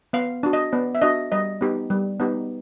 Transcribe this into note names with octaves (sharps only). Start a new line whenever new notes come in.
B3 F5
D4 F#4
D#5
B3 D5
E5
D4 F#4 D#5
G3 D#5
B3 D#4 G4
G3
B3 D#4 G4